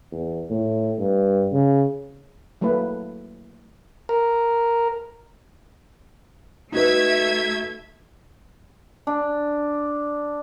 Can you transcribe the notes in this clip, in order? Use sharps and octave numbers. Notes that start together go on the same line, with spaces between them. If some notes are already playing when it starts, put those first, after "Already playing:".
E2
A2
G2
C#3
F#3 A3 A#3 E4 B4
A#4
A3 D#4 F#4 B4 E5 G#6
D4